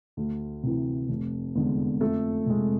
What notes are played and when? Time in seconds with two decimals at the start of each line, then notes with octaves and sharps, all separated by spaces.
0.17 D2
0.63 C3 E3
1.09 F1
1.55 E2 D3 G#3
2.01 F2 A3 A4
2.46 C3 G#3